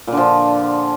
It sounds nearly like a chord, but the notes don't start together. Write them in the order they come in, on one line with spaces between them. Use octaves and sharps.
A#2 D3 F3